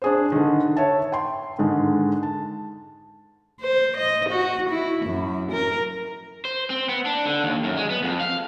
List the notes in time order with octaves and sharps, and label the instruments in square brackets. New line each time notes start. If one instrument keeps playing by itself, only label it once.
[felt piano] D4 G#4 C5
D3 D#3
C#5 E5 A5
G5 C6
G#2 D3 D#3 G#3
A5
[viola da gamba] C5
D#5
F#4
E4
F#2
A#4
[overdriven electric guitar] C5
C4
B3
D4
D3
D#2
F#2
G#3
B3
F2
F5